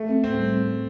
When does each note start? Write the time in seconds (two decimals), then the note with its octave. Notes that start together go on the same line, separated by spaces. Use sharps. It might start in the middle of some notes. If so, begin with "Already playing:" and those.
Already playing: A3
0.09 C4
0.24 A2 C4
0.38 G3